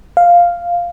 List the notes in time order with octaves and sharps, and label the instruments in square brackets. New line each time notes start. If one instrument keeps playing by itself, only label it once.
[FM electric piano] F5